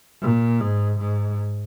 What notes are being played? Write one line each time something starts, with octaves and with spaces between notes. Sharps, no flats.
A#2
G#2
G#2